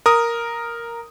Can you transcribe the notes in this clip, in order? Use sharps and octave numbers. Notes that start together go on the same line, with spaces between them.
A#4 D#6